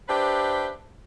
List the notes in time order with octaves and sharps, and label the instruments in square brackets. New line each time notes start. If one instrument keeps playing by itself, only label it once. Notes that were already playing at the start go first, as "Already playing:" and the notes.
[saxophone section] D4 G4 B4 C5 E5